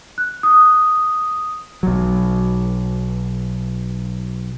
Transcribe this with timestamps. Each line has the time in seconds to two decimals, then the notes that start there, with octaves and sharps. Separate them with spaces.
0.18 F#6
0.43 D#6
1.83 B1 F#3